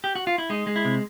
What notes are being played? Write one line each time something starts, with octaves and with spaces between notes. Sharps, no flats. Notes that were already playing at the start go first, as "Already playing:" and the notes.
G4
F#4
F4
E4
G#3 D#4
G#3
E4
C3